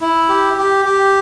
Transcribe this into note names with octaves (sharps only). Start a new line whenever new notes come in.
E4
G4
G4
G4